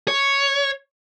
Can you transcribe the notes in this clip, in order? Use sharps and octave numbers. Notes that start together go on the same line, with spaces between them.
C#5